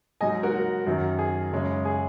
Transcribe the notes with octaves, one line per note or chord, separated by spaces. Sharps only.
G#2 F#3 D#4 D#5 G#5
F#4 A#4
F#4 A#4
F#2 D#3 F#3
G#4
F#2 C#3 G#3 C#4
G#4